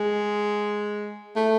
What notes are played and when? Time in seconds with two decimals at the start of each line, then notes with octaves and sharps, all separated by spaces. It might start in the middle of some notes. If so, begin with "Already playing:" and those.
Already playing: G#3
1.36 A3